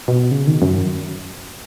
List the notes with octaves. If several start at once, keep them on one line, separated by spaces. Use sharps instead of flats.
B2
C#3
D#3
F#2